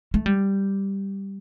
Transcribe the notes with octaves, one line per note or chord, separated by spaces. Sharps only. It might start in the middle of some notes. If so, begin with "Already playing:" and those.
A3
G3